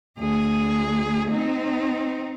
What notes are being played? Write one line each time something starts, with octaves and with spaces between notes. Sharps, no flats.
D2 G#4
C4 D#4